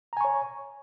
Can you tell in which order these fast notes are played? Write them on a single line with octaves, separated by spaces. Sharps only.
A#5 G#5 C#6 C#5